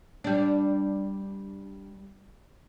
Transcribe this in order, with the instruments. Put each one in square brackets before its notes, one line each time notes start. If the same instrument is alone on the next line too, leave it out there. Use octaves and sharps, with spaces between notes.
[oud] G3 D4